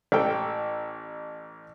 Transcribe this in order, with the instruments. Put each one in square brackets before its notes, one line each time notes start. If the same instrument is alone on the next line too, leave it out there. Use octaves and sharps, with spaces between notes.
[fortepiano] A1 A4 G5